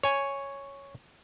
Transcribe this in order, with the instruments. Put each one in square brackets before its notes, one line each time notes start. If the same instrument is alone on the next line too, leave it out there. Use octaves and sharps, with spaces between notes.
[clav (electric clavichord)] C#5 G#5